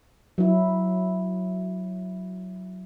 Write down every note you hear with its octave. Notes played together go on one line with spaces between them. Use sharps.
F#3 E4